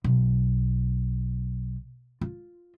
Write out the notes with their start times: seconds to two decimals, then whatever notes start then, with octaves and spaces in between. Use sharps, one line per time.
0.04 B1
2.21 F4